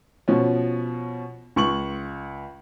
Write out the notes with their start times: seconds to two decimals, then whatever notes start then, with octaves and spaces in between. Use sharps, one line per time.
0.28 B2 F3 C#4
1.56 C#2 C#6 F#7